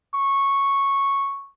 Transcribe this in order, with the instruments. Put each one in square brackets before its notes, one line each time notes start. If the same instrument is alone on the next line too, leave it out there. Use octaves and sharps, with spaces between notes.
[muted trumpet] C#6